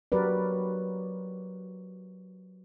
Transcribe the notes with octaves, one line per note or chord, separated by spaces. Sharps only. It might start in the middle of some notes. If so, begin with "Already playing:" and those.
F#3 F#4 G4 A#4 B4 D5